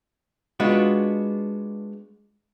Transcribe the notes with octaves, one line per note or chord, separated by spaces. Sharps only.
G#3 B3 D4 F4 F#4